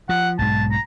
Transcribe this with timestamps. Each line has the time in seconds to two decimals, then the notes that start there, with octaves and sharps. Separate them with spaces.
0.09 F3 F#5
0.39 B1 G#2 G#3 A5
0.72 A#5